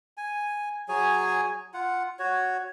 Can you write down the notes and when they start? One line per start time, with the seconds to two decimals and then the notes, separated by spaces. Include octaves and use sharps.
0.17 G#5
0.89 F#3 G#4 C#5 G#5
1.74 F4 F#5
2.19 F#4 C#5